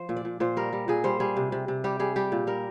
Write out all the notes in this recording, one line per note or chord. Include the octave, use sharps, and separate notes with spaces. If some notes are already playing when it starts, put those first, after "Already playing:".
Already playing: F3 C5
A#2
D5
A#2
A#2 C5
G3 A#4
G3
A#2 G#4
G3 C5
G3 G#4
C3
C3
C3
G3 G4
G3 G#4
G3 G4
A#2
G3 A#4